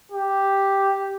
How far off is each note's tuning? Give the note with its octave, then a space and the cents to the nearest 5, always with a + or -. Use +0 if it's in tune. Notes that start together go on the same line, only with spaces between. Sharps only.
G4 +0